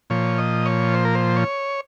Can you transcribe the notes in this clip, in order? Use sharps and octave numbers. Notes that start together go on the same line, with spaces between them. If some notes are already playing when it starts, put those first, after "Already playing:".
A#2 F3 C#5
D#5
C#5
C5
A#4
C5
C#5